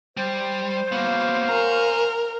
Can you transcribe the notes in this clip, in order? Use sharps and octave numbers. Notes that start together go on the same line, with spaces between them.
G3 C5
A#3 B3 F#4 C#5 F5
A#4 G#5 A#5